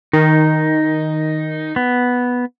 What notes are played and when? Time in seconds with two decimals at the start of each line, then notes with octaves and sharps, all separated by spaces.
0.13 D#3 D#4
1.76 B3